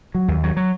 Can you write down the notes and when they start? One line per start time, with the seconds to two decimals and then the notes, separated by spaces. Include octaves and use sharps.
0.15 F#3
0.28 D#2
0.43 F#3
0.57 F#3